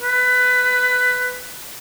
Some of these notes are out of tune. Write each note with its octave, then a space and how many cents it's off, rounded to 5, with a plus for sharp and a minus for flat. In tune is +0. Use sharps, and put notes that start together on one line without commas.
B4 +15